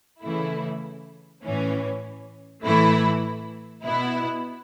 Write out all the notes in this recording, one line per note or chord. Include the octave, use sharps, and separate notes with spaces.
C#3 E3 A3 E4
A2 E3 C#4
A2 E3 A3 E4
B2 B3 E4